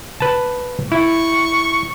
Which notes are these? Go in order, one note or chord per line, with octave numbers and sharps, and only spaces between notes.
B4 A5
E4 C#6